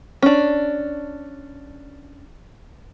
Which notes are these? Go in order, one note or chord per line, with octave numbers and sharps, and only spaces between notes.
C#4 D4